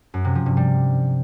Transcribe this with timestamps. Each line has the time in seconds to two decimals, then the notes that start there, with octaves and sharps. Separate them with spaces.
0.14 F#2
0.25 C3
0.35 F3
0.46 G2
0.57 G3